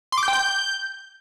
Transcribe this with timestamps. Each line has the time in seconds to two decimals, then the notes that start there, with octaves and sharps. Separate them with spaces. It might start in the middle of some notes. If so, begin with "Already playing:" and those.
0.12 C6
0.18 D6
0.23 G6
0.28 G5
0.33 G6